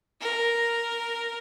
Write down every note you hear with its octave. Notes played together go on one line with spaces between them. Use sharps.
A#4